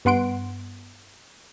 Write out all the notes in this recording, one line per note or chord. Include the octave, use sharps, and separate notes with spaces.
G2 B3 F#5 C6 D7